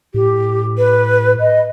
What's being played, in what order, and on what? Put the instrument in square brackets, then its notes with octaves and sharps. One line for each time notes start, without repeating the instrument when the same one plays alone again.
[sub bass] A2 [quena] G4
[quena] B4
D#5